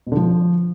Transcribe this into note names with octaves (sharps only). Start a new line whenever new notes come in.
B2
D3
F3